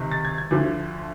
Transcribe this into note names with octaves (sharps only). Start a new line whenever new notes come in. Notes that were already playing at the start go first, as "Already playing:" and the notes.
Already playing: C#2 C3 D#3
A6
G#6
G#6
D2 D3 F3